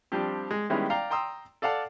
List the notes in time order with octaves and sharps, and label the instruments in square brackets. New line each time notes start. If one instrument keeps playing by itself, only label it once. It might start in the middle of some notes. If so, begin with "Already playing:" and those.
[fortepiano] F3 G3 C4 D4 G4
G#3
D#3 G3 G#3 B3 C#4 E4
D5 F5 G5 A#5
G5 A#5 C6 D#6 E6
A4 D5 F5 F#5 A5